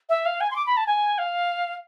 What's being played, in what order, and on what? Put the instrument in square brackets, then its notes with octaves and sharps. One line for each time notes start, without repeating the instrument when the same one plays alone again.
[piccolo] E5
F5
G#5
C6
D6
B5
A5
G#5
F5